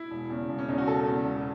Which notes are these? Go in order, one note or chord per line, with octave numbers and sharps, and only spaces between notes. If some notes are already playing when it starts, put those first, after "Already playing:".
Already playing: E4
E1
E2 C#3
E1
C#4
E2 C#3 D#4
F#4
E1 A4
E2 C#3
E1